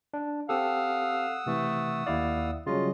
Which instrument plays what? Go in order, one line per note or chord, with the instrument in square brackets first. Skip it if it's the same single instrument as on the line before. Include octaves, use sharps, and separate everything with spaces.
[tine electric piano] D4
[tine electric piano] C4 G4 A4 [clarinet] F5 [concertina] F#5 D#6 E6
[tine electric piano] C3 E3 [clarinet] A3
[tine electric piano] D#2 E4 D5 [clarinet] F5
[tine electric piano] C#3 F#3 G3 [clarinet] F4 [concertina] D#5